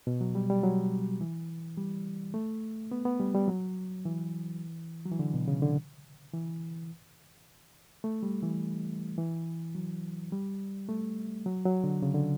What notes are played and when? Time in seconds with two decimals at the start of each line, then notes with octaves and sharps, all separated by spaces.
0.07 B2
0.21 F#3
0.35 G3
0.50 G3
0.64 F#3
1.21 E3
1.78 G3
2.34 A3
2.92 B3
3.05 B3
3.20 G3
3.34 G3
3.48 F#3
4.05 E3
5.05 F#3
5.12 E3
5.19 D3
5.34 B2
5.48 C#3
5.62 D3
6.33 E3
8.04 A3
8.23 G3
8.43 E3
9.18 E3
9.75 F#3
10.32 G3
10.89 A3
11.46 F#3
11.65 F#3
11.84 D3
12.02 C#3
12.14 D3